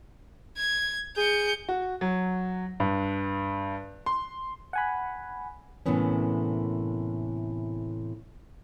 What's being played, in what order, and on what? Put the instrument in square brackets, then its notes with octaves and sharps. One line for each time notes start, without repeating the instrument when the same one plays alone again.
[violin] G#6
[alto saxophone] G#4 [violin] G6 C#7
[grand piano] F#4
F#3
G2
C6
[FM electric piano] F#5 G#5 B5
[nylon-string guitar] A2 C3 E3 A#3 B3 C#4